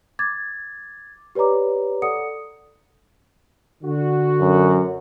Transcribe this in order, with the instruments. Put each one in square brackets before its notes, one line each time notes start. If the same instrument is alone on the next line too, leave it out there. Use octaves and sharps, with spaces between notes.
[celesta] D6 G#6 A6
G4 B4 C#5 D5 A#5 D6
A4 D5 F#5 D#6 C#7
[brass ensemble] D3 F#4
[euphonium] F#2